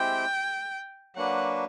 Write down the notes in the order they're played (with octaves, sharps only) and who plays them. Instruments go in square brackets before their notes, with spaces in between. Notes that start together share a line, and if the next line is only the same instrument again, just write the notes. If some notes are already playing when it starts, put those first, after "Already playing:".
Already playing: [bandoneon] G#3 C4 E4 G4 C5 [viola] G5
[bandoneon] F#3 A#3 D4 F#4 B4 [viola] F#5